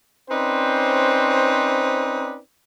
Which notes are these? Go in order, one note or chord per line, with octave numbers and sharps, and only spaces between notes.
C4 C#4 D#4 B4 C5 D5